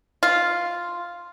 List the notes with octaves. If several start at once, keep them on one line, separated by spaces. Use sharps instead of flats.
F4